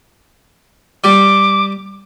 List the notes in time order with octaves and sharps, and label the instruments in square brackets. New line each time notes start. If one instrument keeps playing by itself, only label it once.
[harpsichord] G3 [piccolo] D6